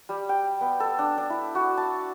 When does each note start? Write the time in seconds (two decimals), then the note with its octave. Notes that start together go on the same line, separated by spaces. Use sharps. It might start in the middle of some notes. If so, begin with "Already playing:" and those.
0.09 G3
0.29 G5
0.61 B3
0.80 A4
0.99 D4
1.18 D4
1.30 E4
1.55 F#4
1.78 A5